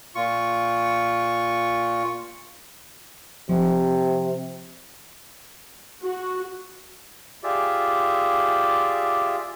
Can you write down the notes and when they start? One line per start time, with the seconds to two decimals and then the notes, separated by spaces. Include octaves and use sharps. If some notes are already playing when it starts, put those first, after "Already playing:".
0.15 A#2 F4 C#6
3.49 C3 F3
6.02 F#4
7.43 F4 G4 G#4 D5 E5